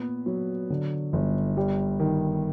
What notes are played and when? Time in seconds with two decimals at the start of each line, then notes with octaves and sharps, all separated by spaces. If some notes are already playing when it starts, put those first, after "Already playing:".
Already playing: A#2 B3
0.26 F#3
0.70 D3
1.13 G1
1.57 G3
1.99 D#3